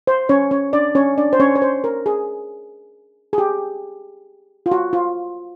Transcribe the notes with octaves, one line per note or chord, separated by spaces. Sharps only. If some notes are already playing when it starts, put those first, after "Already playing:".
C5
C#4 C#5
C#4 C#5
D4 D5
C#4 C#5
D4 D5
C5
C#4 C#5
C#5
C5
A#4
G#4
G#4
G4
F4
F#4
F4